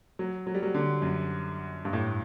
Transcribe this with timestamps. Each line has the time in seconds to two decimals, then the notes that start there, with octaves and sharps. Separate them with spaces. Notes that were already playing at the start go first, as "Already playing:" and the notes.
0.19 F#3
0.47 F#3
0.54 G3
0.63 F#3
0.75 D3
1.02 F#2
1.85 G2
1.93 A2